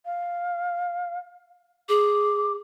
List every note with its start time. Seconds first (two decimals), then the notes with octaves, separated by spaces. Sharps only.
0.05 F5
1.89 G#4 D6